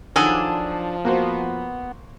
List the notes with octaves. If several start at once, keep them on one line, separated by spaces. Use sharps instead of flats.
D#3 F3 F#3 D4 G#4 A4
A#3 B3 F#4 C5